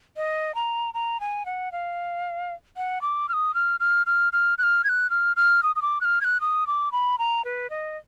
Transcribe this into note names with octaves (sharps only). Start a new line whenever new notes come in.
D#5
A#5
A#5
G#5
F#5
F5
F#5
D6
F6
D#6
F6
F6
F6
F6
F#6
F6
G#6
F#6
F6
F6
D#6
D#6
D6
F#6
F6
G#6
F#6
D#6
D6
B5
A#5
B4
D#5